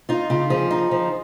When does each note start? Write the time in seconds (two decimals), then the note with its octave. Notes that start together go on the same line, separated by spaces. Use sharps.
0.09 D#4 F4
0.30 C#3 F4
0.50 F3 G#4
0.71 D#4
0.91 F3